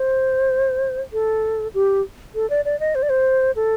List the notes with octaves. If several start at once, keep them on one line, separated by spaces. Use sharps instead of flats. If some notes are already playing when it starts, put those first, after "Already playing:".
Already playing: C5
A4
G4
A4
D5
D5
D#5
C5
D5
C5
A4